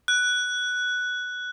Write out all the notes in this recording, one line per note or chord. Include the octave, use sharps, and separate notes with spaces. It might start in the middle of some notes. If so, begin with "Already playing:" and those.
F#6